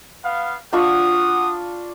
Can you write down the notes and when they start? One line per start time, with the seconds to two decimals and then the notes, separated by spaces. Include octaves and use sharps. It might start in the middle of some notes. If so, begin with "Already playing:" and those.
0.24 B3 F5
0.73 D4 F4 F#4 F#5 C#6 D#6